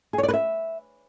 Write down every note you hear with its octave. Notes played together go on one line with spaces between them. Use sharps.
G#4
C#5
D5
B4
E5